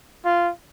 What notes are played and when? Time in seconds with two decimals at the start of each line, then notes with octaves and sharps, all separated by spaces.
0.25 F4